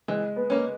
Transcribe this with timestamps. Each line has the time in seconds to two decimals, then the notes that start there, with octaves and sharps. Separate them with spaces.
0.08 E3 G#3
0.36 B3
0.50 A#3 C#4